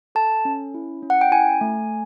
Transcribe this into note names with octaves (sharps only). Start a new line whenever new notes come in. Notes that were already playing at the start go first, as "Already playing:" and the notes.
A4 A5
C#4
E4
C#4
F#5
G5
E4 G#5
A3